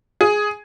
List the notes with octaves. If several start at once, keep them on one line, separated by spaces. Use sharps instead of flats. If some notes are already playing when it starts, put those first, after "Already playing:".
G#4